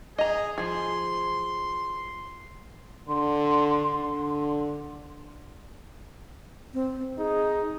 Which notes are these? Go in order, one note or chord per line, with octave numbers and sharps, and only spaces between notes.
G#4 D#5 A#5
F3 G#4 C6
D3 C6
D3
C4
D#4 G#4